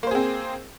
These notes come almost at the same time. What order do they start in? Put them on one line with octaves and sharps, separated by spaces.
A#3 C5 G#4 C4